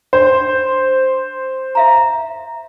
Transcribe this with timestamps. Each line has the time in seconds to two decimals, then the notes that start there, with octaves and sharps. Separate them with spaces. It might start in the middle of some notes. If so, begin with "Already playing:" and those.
0.13 D4 C5
1.75 E5 F5 A#5